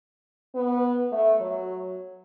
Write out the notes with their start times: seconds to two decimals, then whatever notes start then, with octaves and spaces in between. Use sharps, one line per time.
0.55 B3
1.12 A3
1.40 F#3